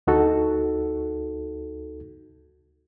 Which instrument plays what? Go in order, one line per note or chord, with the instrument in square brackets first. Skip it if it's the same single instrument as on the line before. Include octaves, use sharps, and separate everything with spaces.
[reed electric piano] D2 D#4 F#4 A4